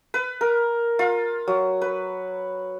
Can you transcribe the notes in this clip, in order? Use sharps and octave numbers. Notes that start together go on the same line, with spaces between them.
B4
A#4
F4
F#3
B4